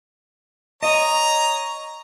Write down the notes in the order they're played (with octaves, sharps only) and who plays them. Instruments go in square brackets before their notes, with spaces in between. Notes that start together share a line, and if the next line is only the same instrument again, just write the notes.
[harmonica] C#5 A#5 [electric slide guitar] D#5